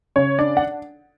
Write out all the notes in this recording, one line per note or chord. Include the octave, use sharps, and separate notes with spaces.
C#3 C#5
D4 D5
F#5